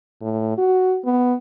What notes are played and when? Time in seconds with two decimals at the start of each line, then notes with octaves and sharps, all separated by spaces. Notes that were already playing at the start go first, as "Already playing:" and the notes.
0.22 A2
0.58 F#4
1.05 B3